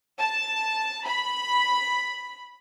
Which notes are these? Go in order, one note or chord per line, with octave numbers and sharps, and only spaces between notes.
A5
B5